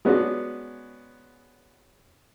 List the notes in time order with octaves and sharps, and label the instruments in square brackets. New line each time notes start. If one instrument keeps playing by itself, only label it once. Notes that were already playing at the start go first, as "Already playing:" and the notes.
[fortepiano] G#3 B3 C#4 D4 F#4